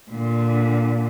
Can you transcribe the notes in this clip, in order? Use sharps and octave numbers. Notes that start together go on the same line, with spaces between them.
A#2 D3